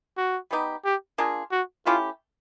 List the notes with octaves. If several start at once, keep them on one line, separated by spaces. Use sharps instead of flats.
F#4
G3 B3 D#4 G4
G4
A#3 D4 F4 G#4
F#4
A3 C#4 E4 F4 G4